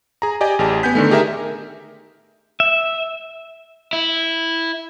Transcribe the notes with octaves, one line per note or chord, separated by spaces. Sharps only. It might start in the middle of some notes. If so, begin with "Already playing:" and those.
G#4 A#5
G4 D5 D#5 G#5
A1 G4 G#4 A5
B3 G#5 G6 B6
D3 D#3 A3
D#4 G4 G#4 A#4 E5 G5
E5
E4